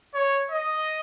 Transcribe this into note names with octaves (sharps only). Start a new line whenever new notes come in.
C#5
D#5